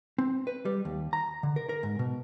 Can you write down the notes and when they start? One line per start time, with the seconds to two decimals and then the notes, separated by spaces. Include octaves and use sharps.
0.18 C4
0.47 B4
0.65 G3
0.85 D#2
1.13 A#5
1.43 D3
1.56 A#4
1.69 A#4
1.83 G#2
1.99 B2